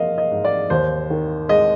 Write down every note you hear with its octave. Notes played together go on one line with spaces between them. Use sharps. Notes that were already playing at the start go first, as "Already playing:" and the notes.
Already playing: F3 A#3 D#5 F5
D#5
G#2
D5
D#2 C5
D#3
G#3 D#5